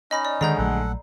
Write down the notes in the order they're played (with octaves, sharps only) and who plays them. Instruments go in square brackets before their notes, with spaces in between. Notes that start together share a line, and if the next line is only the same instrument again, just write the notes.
[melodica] C#4 D#4 [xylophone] D#5 B5 A#6
[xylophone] D5
[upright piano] D2 G#3 [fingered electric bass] D#3 [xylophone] D5 A#5 G6
[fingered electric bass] A#1 F#3 A3 [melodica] A4 F#5